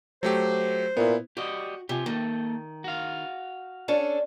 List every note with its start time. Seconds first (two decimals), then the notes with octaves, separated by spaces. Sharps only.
0.23 F#3 A3 G4 C5
0.97 A#2 B3 E4
1.37 F#4 G4 D5 D#5
1.89 C3 F3 G4 G#5
2.06 D#3 A#3 A4
2.84 F#4 F5
3.88 C#4 D4 A4